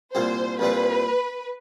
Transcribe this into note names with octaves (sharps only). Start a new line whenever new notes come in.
C2 A#2 G3 C4 C5
C2 A#2 G3 C4 B4